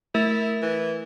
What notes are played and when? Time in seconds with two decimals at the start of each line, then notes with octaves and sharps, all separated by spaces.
0.14 A3 E4 A#4
0.62 E3